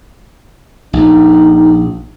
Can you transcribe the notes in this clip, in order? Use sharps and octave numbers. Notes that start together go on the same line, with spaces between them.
A#1 D#4